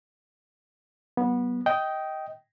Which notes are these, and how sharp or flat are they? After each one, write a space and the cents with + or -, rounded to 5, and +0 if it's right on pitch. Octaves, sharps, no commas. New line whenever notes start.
F#3 +35 B3 -20
D#5 +15 G5 -10